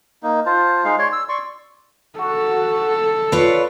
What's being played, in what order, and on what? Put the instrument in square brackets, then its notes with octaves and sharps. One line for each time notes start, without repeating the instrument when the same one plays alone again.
[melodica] A#3 D#4
F4 C5 A5
G#3 D#4 F5
C#5 D5 C6
E6
D5 C6 C#6
[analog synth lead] F#4 [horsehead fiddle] A4
[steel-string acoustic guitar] D4 F4 C#5 [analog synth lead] B4